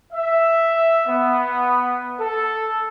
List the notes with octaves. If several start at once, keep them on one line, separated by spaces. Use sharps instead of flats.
E5
B3
A4